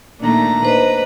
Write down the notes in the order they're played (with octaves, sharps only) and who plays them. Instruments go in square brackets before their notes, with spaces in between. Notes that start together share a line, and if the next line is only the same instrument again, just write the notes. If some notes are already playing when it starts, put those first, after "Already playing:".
[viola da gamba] A#2 D#3 A3 [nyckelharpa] D4 A#5
[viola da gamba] B4 [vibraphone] C5 D#5